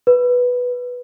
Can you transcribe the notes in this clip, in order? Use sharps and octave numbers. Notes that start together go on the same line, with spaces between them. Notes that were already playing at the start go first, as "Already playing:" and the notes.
B4